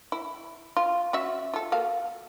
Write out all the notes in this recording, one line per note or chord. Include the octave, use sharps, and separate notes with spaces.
E4
F4
C#4 F#4 E5
F4 A4
A#3 F#4 F5